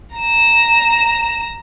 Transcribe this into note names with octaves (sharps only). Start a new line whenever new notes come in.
A#5 E7